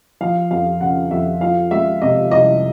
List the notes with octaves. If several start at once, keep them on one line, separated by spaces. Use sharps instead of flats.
F3 F5
F2 F5
C#3 F#5
F2 E5
F3 F5
G#3 E5
C3 D#5
C2 D#5